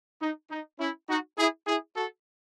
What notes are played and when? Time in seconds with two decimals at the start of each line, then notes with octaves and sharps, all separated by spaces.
0.21 D#4
0.51 D#4
0.79 C#4 E4
1.09 D#4 F#4
1.38 E4 G#4
1.67 E4 G#4
1.96 F#4 A4